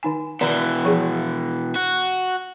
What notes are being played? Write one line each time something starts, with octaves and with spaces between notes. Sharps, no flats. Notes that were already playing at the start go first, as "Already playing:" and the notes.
D#3 D#4 G#5
B2 D#3 E3 D5 A#5
F3 G#4
F#4